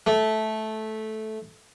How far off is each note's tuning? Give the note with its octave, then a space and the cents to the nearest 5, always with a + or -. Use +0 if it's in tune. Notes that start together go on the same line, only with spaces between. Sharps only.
A3 -10